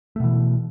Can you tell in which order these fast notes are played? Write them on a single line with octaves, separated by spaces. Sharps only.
A3 B2 E3